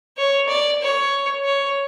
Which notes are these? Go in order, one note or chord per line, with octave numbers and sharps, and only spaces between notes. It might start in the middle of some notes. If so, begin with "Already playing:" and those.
C#5
D5
C#5
C#5